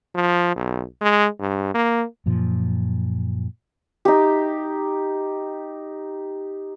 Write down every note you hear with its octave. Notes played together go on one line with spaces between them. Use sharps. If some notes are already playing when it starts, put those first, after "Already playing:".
F3
B1
G#3
G2
A#3
F#2 A#2 F3
D#4 G4